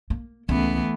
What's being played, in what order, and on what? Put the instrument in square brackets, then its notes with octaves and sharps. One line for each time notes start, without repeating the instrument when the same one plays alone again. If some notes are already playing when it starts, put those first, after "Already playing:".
[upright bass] A#3
[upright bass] C#2 [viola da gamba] E3 A3 B3